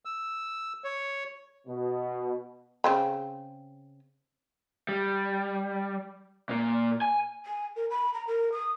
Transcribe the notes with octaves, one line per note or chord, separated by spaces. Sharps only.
E6
C#5
B2
C#3 C4 B5
G3
A#2 A#3
G#5
G#5
A#4
B5
A#5
A#4
D#6